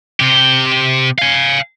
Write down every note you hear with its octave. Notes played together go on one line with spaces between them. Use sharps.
C3 G4
F5 G#5